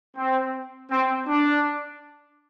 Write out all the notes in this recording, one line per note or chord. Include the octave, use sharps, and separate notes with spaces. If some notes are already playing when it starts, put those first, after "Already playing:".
C4
C4
D4